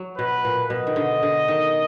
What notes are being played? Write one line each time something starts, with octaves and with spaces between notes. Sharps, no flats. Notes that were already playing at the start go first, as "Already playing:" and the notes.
Already playing: F#3
B2 B4
A#2
B2 D#5
D#3
D3
D3
D#3